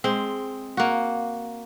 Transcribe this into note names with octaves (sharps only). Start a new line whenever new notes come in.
G#3 C4
A#3 F#4